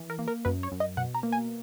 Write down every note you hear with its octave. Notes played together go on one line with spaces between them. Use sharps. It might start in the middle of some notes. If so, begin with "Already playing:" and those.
Already playing: E3
A#4
A#3
A#4
F#2 B4
C#5
F#2
D#5
B2 F#5
A#5
A#3
G#5